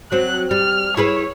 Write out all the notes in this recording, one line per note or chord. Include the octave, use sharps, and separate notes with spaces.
F#3 C4 F#6
G3 F6
E4 G#4 B4 C#5